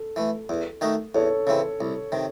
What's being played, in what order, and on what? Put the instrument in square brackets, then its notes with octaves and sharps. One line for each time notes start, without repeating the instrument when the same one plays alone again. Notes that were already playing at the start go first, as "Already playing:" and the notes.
Already playing: [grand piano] A4
[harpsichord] E3 A3
E2
D#3 A3 D#4 F#4
[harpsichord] E2 [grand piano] A4 C#5
[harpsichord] C#3 E3 C4
C2
C3 D#3